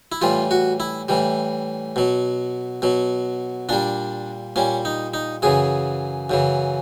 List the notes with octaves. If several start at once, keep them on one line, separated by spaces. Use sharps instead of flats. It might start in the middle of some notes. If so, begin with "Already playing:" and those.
E4
A2 E3 G3 F4
F#4
E4
A2 E3 G3
B2 F#3
B2 F#3
A#2 G3 D4
A#2 G3 C#4
D#4
D#4
F#2 C#3 E3 G#4
F#2 C#3 E3